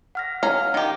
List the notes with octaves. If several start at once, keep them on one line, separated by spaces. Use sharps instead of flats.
F#5 F6 A#6
C#4 F5 A#5
D#3 G4